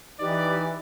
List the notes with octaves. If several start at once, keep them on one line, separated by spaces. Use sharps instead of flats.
E3 D#4 G4 B4 D5